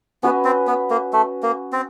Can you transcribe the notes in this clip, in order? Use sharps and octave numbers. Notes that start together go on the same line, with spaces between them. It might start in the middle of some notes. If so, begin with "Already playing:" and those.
B3 C#4 F#4 B4 D#5
C4
B3
A#3
A3
A#3
C4